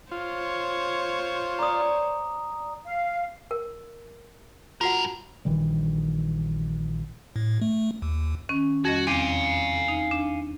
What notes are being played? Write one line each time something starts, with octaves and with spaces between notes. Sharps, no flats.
F4 C5 C#5
D5 A#5 D#6
F5
A#4
G2 F4 F#4 A#4 F#5
A#1 D#3 E3 G3
A2
A3
D#2
D#3 C#4
F2 G3 F#4 D#5
E2 C4 F5 G#5 D6
D#4
D4